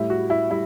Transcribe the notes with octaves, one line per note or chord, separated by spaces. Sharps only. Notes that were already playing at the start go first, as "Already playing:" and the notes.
Already playing: A2 G3 E4
F#4
E4
G3 E4